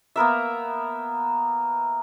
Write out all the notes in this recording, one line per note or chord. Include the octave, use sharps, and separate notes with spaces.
A#3 B3 A#4 E5